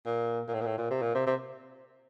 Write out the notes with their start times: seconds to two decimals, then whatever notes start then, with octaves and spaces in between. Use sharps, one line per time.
0.06 A#2
0.48 A#2
0.54 A2
0.61 A#2
0.66 A2
0.78 A#2
0.91 C3
1.02 A#2
1.15 C3
1.26 C3